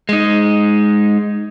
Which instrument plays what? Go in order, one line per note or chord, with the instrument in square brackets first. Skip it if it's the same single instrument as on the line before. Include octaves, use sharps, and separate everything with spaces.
[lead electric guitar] G#3 D#4